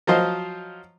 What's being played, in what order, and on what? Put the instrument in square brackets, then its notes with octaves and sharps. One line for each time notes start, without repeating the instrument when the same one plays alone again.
[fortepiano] F3 F#3 F4 C5 D#5